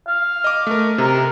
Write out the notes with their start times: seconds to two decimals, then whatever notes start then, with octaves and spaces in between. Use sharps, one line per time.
0.08 F5
0.44 D#5 D6
0.67 A3 A#4
0.98 C3 A#4